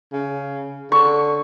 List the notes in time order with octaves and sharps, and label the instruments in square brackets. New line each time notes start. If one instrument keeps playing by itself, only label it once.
[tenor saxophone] C#3
[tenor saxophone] D3 [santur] C#6